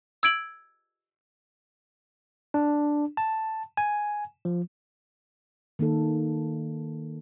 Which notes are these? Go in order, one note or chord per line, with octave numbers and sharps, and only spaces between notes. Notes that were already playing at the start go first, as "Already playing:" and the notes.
E6 G#6 D7 F#7
D4
A5
G#5
F3
D#3 A#3 D#4 A4